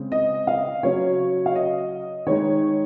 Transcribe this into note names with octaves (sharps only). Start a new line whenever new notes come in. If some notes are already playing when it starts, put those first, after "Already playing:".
Already playing: C#3 G#3 C4
D#5
F5
C#3 F#3 C#4 C#5
F5
D#5
D#3 G#3 D#4 C#5